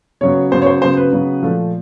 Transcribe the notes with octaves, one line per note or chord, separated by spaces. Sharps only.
C#3 F#3 B3 C#5
C#3 F#3 B3 C5
C#5
C5
C#3 F#3 B3 C5
B4
C#3 F#3 B3
A#2 F3 A3